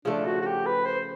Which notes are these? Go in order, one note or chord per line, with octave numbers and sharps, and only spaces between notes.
C#3 F3 A3 D4
F#4
F#4
G4
B4
C5